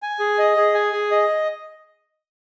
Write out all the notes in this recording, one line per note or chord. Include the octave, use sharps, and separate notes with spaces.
G#5
G#4
D#5
G#4
G#5
G#4
D#5